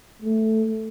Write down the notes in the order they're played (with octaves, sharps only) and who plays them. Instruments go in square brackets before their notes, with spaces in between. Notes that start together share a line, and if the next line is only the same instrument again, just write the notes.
[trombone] A3